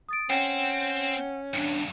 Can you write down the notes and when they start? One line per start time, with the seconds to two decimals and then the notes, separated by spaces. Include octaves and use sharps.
0.09 D#6 A6 D7
0.30 C4 C#4 F#5 G5
1.54 E2 G2 D4